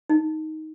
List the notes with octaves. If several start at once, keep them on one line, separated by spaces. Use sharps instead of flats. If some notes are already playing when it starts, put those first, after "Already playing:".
D#4